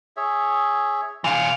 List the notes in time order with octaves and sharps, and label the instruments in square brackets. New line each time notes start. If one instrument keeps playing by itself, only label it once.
[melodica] G#4 C#5 E5
[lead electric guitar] E3 F5 [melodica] C6